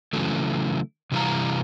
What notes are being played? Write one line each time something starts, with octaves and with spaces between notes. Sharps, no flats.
C#3 E3 F#3 A3
C3 E3 G3 G4 F5 A#5